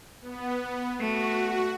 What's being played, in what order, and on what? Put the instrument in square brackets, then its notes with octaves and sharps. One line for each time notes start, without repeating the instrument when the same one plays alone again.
[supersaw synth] B3
[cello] A3 [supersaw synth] F#4